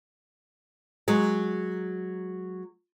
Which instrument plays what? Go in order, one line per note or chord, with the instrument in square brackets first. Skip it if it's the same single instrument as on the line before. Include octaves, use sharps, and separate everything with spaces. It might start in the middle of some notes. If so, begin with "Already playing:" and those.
[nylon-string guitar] F#3 G#3